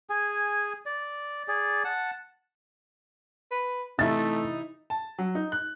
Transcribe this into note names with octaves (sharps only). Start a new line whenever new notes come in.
G#4 G#5
D5
G#4 D5
F#5 A5
B4
C3 E3 A3 D#4 E4 A6
A5
F#3
D#4
F#6